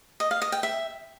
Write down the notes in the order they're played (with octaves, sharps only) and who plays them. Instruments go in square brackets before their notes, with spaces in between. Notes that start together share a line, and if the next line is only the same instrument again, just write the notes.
[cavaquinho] D#5
F5
D#5
G5
E5